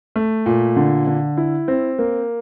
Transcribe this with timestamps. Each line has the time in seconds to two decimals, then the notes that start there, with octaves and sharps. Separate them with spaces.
0.16 A3
0.46 A#2
0.76 D3
1.07 D3
1.37 E4
1.68 C4
1.99 A#3